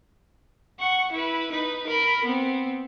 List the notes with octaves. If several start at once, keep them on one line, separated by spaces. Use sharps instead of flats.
F#5 C#6
E4 B4
D#4 B4
A#4 B5
B3 C4